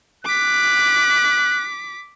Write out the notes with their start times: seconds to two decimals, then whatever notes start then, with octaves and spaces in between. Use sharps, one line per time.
0.25 D6 F#6 B6